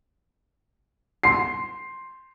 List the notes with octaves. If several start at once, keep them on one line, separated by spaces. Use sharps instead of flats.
C6 C7